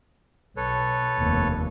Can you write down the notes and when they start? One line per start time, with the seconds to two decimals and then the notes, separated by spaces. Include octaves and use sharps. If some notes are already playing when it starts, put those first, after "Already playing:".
0.57 B1 A4 B4 C#5
1.18 F1 D#2